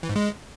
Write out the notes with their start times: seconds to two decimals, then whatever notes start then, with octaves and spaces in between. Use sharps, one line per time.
0.03 E3
0.09 G#2
0.16 G#3